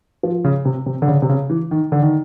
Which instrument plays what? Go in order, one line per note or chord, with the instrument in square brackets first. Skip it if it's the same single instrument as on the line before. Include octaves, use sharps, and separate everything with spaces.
[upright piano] F3
C#3
C3
C3
D3
C#3
C3
C#3
E3
D#3
D3
D#3